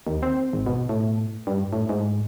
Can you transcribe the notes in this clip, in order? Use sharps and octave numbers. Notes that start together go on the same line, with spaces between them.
D#2
C4
G#1
B2
A2
G2
A2
G#2